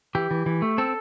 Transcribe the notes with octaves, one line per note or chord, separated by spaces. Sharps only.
E3 G4
E3
E3
A3
C4 A4